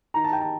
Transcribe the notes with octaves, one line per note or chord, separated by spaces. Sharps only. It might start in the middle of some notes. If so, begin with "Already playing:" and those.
D#3 A#5
A5
G5
A5